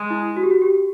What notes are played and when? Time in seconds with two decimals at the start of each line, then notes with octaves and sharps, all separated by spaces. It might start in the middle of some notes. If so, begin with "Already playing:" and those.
Already playing: G#3
0.10 E4
0.37 F#4
0.43 G4
0.51 F#4
0.62 G4